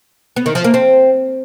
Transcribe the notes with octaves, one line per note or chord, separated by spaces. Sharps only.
B3
D#3
F3
A#3
C4